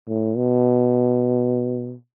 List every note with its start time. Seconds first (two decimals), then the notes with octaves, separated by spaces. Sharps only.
0.08 A2
0.37 B2